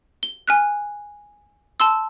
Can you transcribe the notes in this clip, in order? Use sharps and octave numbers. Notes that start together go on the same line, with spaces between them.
G7
G#5 F6 F#6
A5 C6 E6